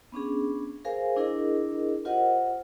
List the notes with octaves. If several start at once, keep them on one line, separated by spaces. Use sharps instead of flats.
B3 C#4 D4 G#4
G#4 A#4 C5 F5 G#5
D4 E4 G#4 A#4 D#5
F4 G4 A#4 C5 D#5 F#5